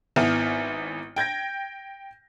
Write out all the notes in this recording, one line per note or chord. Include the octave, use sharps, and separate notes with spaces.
G#1 B3 E4 G#5 F6
G5 G6 G#6 A#6